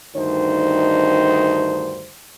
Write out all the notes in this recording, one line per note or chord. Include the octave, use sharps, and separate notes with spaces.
D2 G2 D#3 D#4 C5